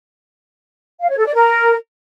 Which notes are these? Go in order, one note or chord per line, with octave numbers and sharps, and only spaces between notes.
F5
C#5
A4
D5
A#4